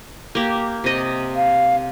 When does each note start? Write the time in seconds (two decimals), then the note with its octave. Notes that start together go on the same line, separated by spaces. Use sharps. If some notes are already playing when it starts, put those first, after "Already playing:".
0.35 A#3 G4
0.84 C3 D#5
1.36 F5